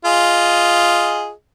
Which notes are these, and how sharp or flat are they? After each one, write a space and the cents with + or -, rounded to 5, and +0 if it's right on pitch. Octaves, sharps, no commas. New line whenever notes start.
F4 +0 G#4 +0 D#5 +0